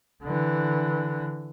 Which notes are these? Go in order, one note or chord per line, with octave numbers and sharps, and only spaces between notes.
D3 E3